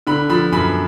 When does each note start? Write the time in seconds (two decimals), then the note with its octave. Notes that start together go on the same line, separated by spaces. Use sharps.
0.07 D3 B5
0.30 F3 B5
0.52 F#2 B5